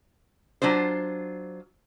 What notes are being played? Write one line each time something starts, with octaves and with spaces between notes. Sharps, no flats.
F#3 D4 F4 C5